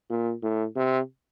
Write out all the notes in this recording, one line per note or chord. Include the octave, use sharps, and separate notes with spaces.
A#2
A2
C3